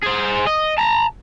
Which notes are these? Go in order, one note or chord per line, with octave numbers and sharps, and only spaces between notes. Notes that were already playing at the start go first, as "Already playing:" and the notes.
G#4 C5
D#5
A5 A#5